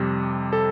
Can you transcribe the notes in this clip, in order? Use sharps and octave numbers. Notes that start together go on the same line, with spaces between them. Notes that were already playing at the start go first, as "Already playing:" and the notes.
Already playing: F2 C3 G3
A4